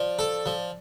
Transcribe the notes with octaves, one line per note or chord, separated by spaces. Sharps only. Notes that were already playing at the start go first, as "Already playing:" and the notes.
Already playing: F3 D5
A4
F3